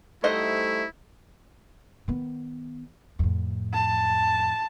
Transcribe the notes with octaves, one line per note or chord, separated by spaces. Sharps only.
G3 A3 D#4 E4 C5 D#5 F#5
D#3 B3
F2 A2
A5